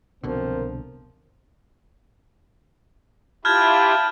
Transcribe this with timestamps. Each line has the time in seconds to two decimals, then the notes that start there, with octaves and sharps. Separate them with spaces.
0.24 C2 F#2 B2 D3 F3 C4 A#4
3.45 E4 F4 G4 A5 B5 F6 G6 G#6